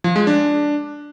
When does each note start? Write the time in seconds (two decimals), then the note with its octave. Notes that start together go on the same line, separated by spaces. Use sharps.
0.04 F3
0.16 G#3
0.27 D4